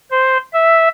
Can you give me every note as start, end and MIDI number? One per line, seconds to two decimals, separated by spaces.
0.11 0.37 72
0.53 0.89 76